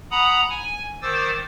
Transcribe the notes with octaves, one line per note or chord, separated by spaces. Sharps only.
F#5 A#5 B5 D#6
G#5
D#3 C5 D6 E6 A6